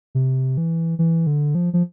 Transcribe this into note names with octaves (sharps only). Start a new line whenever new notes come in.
C3
E3
E3
D3
F3
F3